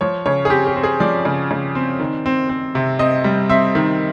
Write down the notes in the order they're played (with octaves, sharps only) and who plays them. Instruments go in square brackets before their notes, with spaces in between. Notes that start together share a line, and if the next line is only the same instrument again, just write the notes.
[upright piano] F3 C#5
C#3 C#5
G#4
C4 G4
G4
C4
G#4
F3 D5
C#3
C#3
C4
D#3
C4
C4
C3
C4 D#5
G3
C4 E5
D#3